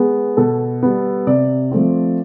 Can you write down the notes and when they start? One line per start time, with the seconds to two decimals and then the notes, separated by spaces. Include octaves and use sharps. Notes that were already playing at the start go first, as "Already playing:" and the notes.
Already playing: G#3 B3
0.37 B2 A4
0.83 G3 B3
1.27 C3 D5
1.71 F3 A3 C4